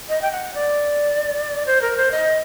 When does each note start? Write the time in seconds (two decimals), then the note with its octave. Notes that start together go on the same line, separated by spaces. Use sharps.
0.09 D#5
0.22 G5
0.32 F#5
0.54 D5
1.67 C5
1.82 A#4
1.97 C5
2.11 D#5